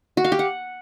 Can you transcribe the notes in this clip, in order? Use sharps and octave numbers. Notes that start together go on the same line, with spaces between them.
F#4
F5
G4
F#5